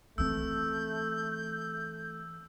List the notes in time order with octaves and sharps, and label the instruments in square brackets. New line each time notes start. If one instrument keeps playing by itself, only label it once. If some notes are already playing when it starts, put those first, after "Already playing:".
[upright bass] E3 C4 [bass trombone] A3 [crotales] E6 [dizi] G6